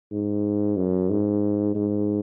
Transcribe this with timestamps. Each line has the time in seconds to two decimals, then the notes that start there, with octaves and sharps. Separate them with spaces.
0.12 G#2
0.77 F#2
1.10 G#2
1.75 G#2